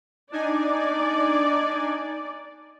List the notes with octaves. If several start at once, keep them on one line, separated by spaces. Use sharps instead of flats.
D4 D#4 D5 G#5